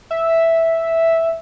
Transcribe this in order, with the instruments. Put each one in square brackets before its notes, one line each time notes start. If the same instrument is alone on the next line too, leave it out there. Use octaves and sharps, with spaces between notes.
[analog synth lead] E5